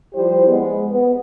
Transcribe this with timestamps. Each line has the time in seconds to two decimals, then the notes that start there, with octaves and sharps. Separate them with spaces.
0.14 F3 G3 E4 G4 C5
0.48 G#3 B3
0.89 B3